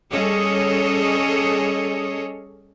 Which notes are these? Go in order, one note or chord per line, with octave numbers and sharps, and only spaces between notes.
G3 C#4 G#4 A4 C#5 D#5